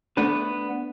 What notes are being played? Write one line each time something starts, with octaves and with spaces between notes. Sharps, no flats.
A3 B3 D4 B4